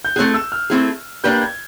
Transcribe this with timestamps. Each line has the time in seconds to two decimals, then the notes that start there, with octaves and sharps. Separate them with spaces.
0.05 G6
0.16 A3 C4 E4 G#4 F#6
0.34 E6
0.52 F6
0.70 A3 C4 E4 G#4
1.24 A#3 D4 G4 B4 G6
1.42 G#6